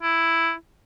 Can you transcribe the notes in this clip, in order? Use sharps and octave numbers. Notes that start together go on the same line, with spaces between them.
E4